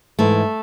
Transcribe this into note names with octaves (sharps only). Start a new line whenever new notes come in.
G#2 E3 A3